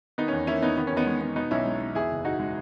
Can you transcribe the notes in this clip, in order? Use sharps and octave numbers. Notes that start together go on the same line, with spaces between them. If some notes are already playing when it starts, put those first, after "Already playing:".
D#3 B3 D#4
E2 C#4
A#3 C#4 E4
E2 B3 D#4
D#3 B3
C#4
E2 B3 D#4
G#3
B3
B2 B3 D#4
B1 C#4 E4
G#3
B3
E2 E4 G#4
F#1
B2 D#4 F#4
G#3